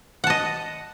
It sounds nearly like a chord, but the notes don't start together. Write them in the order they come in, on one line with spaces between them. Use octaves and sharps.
F#5 A5 D#5